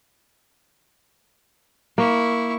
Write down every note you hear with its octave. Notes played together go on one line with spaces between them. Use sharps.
A#3 E4 C#6